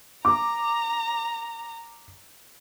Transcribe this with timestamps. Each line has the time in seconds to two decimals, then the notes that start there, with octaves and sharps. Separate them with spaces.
0.25 A#5 D6